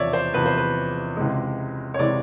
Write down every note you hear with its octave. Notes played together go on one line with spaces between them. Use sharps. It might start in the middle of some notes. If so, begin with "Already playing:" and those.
Already playing: E1 E2 C3 F3 C#5 D5 E5
C5
E1 E2 C3 F3 B4
C5
B4
C#2 C3 E3 G#3
C#5
C3 E3 G#3 D5